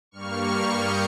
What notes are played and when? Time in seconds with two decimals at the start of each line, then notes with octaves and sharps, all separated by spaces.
0.11 G2 G3 A#3 C#6 F6
0.74 D#6 G6